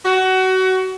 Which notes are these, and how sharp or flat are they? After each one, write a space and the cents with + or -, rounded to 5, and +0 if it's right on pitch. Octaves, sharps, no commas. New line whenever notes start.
F#4 +25